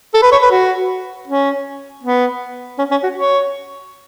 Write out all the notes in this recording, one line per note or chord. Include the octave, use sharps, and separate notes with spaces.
A4
B4
C#5
B4
F#4
C#4
B3
C#4
C#4
F#4
C#5